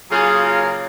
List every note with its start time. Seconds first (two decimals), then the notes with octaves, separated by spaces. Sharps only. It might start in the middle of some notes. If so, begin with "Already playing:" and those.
0.10 C#3 F#3 A#3 F4 G#4
0.40 A#4